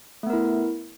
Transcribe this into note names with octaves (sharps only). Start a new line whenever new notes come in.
A3 B3 E4 A#4